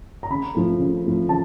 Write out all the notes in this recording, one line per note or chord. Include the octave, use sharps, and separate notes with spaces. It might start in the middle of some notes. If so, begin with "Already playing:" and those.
A#5
C#3 B5
F3 A3
C#3
F3 A3
C#3 A5